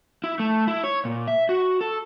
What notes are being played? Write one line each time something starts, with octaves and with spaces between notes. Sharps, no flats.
E4
A3
E4
C#5
A#2
E5
F#4
A4